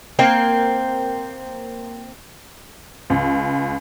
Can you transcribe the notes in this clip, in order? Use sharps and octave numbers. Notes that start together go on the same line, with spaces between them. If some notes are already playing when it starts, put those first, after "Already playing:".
A#3 C4 G5
C#2